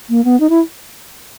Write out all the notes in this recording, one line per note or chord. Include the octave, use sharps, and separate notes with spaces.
A#3
B3
D#4
E4